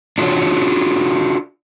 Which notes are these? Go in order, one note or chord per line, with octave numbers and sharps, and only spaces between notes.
D4 F4 F#4 A4 C#5